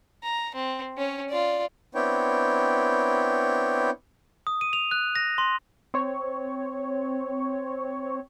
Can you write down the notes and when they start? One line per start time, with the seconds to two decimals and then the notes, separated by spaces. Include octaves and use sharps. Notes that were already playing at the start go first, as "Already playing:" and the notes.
0.23 A#5
0.55 C4
0.97 C#4 C#5
1.29 F4 D5
1.95 B3 C4 D4 E4 C#5 G5
4.47 D#6
4.61 D#7
4.73 F7
4.91 F#6
5.16 A#6
5.38 C6
5.94 C4 C#5